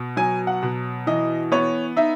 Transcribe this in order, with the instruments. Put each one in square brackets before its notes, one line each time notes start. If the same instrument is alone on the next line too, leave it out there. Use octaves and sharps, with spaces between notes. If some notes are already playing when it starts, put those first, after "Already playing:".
Already playing: [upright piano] B2
F#3 G#5
F#5
B2
E3 D#5
B3 C#5
D#4 E5